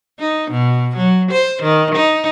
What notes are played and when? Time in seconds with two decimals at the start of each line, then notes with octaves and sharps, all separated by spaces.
0.19 D#4
0.51 B2
0.97 F#3
1.31 C5
1.63 D#3
1.95 D#4